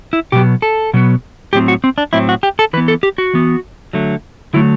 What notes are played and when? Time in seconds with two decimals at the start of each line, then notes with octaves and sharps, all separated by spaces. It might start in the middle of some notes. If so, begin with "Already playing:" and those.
0.13 E4
0.32 B2 F#3 B3 G4
0.62 A4
0.94 B2 F#3 B3
1.53 A2 F#3 C4 G4
1.68 F#4
1.84 C4
1.98 D4
2.13 A2 F#3 C4 E4
2.29 F#4
2.43 G4
2.59 A4
2.73 E3 B4
2.77 B3
2.88 A4
3.03 G4
3.18 F#4
3.34 E3 B3
3.93 D3 F#3 A3
4.53 D3 F#3 A3 E4